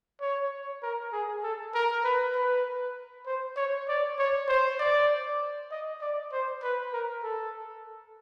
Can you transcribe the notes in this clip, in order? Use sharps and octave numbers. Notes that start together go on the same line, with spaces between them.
C#5
A#4
G#4
A4
A#4
B4
B4
C5
C#5
D5
C#5
C5
D5
D#5
D5
C5
B4
A#4
A4